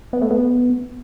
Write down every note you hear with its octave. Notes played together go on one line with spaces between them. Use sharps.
B3
A3
B3